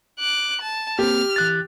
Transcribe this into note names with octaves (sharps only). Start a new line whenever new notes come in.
D6 F#6
A5
A#3 C4 G4 F6
E3 F#6 A6